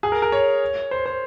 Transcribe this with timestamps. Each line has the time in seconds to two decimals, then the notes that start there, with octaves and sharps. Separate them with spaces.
0.03 G#4
0.12 A#4
0.22 A#4
0.32 C#5
0.91 C5
1.06 C5